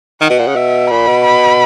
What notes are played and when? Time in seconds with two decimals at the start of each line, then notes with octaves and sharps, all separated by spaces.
0.21 D#3 F#5
0.30 B2
0.39 A#2
0.48 C#3
0.56 B2 E5
0.90 A#2 B5
1.07 B2
1.24 B5